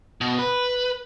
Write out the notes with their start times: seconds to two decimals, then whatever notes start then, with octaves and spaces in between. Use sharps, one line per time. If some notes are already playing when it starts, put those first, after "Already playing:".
0.21 B2
0.39 B4